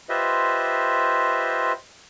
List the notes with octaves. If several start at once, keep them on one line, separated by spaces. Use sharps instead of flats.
F4 G4 B4 C5 D#5 E5